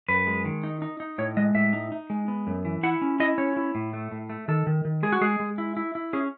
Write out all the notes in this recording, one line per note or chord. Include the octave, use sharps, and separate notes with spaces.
F#2 B4
G#3
D#3
D#4
D#4
D#4
A2 C#5
G#3 D#5
A2 E5
D#4
D#4
G#3
B3
F#2
E3
E4 F#5
C#4
E4 D#5
C#4 C#5
E4
A2
A3
A2
A3
D#3 A4
D#3
D#3
G#3 G#4
F#4
G#3 G#4
G#3
E4
E4
E4
C#4 G#4